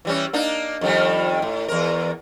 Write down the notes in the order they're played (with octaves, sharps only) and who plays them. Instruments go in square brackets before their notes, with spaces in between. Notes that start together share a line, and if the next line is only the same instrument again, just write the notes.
[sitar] E3 G3 C#4
A#3 D4 D#4
F2 D#3 G3
A2
E2 A#4